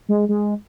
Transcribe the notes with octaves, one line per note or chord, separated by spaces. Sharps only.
G#3
G#3